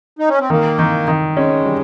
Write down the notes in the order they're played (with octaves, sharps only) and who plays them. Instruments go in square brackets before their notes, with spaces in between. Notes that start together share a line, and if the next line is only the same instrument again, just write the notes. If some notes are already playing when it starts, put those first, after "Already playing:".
[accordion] D#4
C#4
C4
[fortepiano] D#3 [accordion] A#3
[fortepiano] D#3
D#3
[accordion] G#3 [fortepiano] C#4
[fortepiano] G3